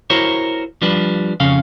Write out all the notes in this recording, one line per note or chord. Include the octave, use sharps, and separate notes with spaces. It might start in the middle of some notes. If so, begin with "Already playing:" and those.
E4 F#4 A#4 C5 C#5
F3 G3 D4 B4
F2 C#3 C#4 F5